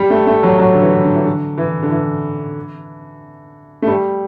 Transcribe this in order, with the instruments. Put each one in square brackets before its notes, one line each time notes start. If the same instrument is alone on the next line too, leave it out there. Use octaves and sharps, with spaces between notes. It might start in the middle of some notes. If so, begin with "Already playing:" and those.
Already playing: [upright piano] G3
A3
A3
F#3
F#3
D3
E3
D3
E3
D3
E3
D3
E3
A3
G3